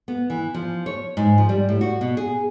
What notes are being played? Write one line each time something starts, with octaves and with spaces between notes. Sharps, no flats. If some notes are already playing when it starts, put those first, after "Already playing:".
B3
E3
F3
C#5
G#2
F3
G3
A2
F#4
B2
G#4